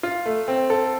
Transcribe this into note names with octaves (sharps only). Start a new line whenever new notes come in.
F4
A3
C4
A4